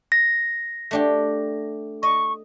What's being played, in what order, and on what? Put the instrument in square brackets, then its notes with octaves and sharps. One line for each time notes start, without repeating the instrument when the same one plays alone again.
[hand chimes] A#6
[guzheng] A3 D4 G4
[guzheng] D#5 [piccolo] C#6